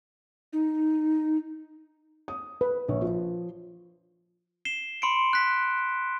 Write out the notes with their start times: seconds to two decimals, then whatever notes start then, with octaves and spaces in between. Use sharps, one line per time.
0.53 D#4
2.28 D#6
2.61 B4
2.88 A#1 C#5
3.02 F3
4.65 C7 E7 G7
5.02 B5 C6 C#7 D7
5.33 F#6 B6